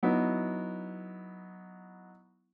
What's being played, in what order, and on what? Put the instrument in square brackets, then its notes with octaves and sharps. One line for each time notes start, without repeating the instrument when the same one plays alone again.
[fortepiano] F#3 B3 D#4 E4